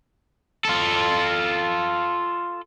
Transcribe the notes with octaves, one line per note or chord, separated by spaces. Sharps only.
F4 A4